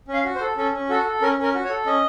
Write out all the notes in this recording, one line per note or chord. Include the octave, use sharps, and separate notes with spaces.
C#4
F5
F#4
C5
A4
C#4 A4
C#4
F#4 A4
A4
C#4 A#4
C#4 A#4
F#4
C#5
A4
C#4 D#5